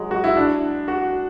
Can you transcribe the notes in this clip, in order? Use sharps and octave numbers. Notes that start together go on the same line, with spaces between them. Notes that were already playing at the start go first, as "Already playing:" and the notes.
Already playing: F#3 G#3
F#4
E4
D4
F#4